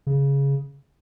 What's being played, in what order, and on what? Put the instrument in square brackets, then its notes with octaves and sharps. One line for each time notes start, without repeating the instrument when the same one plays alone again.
[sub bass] C#3